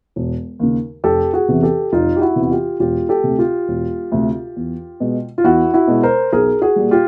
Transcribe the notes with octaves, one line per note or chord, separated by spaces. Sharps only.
E1
D#2 C#3
F1 G4 A4
F#4 G#4
E2 C3 E3
G4 A4
F1 D#4 F4
G4
E4 F#4
E2 C3 E3
F#4
F4 G4
E1 F4 G4
G4 A4
D2 C3
F4 G4
E1
D2 C3
E2
B2 G#3
F4
E2 E4 F#4
E4 F#4
B2 G#3
A#4 C5
B1 G#4 A#4
F#4 G#4
A#2 G3
F4 G4